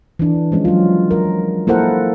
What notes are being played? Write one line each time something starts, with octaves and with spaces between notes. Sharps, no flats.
E3 D4
F3 G#3 C#4
F#3 F4
A#4
A#3 E4 A4 A#4 C5 F#5